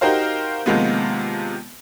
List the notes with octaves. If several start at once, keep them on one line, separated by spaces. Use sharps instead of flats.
D#4 F#4 G4 A#4 C5 F5
C3 D#3 F3 G#3 A#3 B3